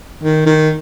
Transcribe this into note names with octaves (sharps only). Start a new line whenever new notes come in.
D#3
D#3